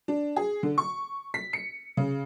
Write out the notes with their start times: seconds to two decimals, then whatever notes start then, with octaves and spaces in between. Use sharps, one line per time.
0.08 D4
0.36 G#4
0.63 D3
0.78 C#6
1.34 B6
1.53 C#7
1.97 C#3